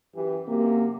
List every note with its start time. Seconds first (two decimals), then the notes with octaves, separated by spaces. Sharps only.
0.14 F#2 E3 G4
0.48 F#2 C3 A#3